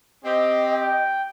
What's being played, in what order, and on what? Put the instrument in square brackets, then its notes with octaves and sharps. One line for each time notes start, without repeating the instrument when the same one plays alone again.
[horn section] C4 G4 [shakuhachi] D#5
[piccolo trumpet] G5